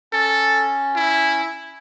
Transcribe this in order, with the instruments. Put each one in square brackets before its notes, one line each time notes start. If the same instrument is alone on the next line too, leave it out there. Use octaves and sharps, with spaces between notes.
[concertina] C#4 [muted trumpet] A4
[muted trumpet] E4